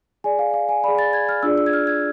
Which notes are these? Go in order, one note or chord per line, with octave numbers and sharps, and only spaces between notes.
G#4 D5 G#5
F5
F5
G#5
G#4 D5 B5
A6
G#6
F6
D4 F4 G#4 D5 E6
E6
G#6
F6
G#6